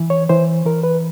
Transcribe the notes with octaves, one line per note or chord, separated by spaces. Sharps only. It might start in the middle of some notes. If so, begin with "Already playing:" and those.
Already playing: E3
C#5
E3 C5
E3 A#4
B4